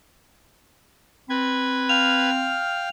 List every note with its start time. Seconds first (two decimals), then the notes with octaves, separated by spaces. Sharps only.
1.30 C4 B4 G#6
1.89 F5 G5 F6 F7